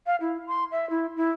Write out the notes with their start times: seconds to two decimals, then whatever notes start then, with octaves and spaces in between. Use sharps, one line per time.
0.06 F5
0.21 E4
0.47 C6
0.71 E5
0.90 E4
1.16 E4